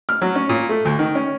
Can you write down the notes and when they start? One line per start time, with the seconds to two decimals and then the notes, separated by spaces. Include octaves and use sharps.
0.09 F6
0.22 F#3
0.36 C#4
0.49 A#2
0.69 A3
0.85 D2
0.99 D#3
1.15 C#4